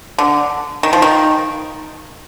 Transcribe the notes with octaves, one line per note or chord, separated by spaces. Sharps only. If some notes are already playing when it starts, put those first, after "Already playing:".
D3
D#3
F3
D#3